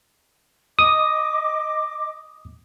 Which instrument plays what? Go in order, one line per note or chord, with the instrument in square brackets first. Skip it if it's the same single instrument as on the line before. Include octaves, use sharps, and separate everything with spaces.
[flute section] D#5 D6 [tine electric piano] D#6